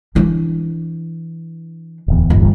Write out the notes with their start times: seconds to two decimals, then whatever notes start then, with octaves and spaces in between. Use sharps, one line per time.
0.15 E3 D4
2.08 D1 E2
2.30 G1